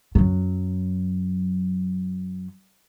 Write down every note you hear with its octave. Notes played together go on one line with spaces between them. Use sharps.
F#2 F#3